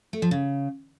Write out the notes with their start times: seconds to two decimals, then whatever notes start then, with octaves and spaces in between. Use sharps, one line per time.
0.13 A3
0.22 F3
0.31 C#3